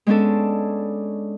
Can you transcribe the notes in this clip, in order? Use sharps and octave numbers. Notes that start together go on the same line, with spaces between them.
G#3 B3 C#4 D4 A4